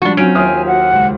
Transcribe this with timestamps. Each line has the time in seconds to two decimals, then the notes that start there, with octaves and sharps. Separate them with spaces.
0.02 F3 G3 D4 F#4
0.17 F#3 C4 C#4 F4 G#5 G6 D7
0.35 D#2 F4 C5 E5 G#5 D#6 F6
0.67 F#4 F#5
0.92 C#2